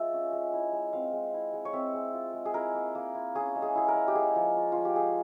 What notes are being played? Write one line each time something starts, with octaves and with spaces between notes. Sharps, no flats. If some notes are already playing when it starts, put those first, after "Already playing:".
Already playing: G#3 F4 E5
C#4
G#3
E4
G#3
C4 F5
G#3
E4
G#3
C#5
C4 E5
G#3
F4
G#3
G#4
E4 A#4
A#3
A#3
E4
C#4 G#4
G#3
G#4
E4 G#4
A#4
G#3
G4
A#3 G#4
F3
F4
F3 F4
G4
G#3 G#4